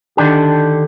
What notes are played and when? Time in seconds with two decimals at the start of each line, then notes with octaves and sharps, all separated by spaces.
0.17 D3 D#3 D4 G4